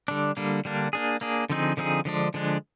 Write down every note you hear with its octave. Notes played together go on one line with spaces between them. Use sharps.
D3 G3 D4
D3 G3 A#3 D4
D3 G3 A#3 D4
A#3 D4 G#4
A#3 D4 G#4
D3 F3 C4 D#4 G#4
D3 F3 C4 D#4 G#4
D3 F3 G#3 D4
D3 F3 G#3 D4